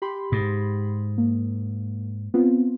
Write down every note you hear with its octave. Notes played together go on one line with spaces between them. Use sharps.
G4 B5 C6
G#2
A#3
B3 C4 F4